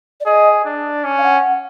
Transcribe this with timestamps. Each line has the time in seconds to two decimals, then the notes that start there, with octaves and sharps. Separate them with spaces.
0.20 D5
0.26 G#4 D#5
0.65 D4
1.04 C#4
1.18 F5
1.23 F#5